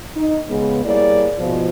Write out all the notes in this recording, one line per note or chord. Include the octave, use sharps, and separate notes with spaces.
D#4
C#3 G#3 B3
G3 A#3 E4 G#4 C#5 D5
G#2 B2 F3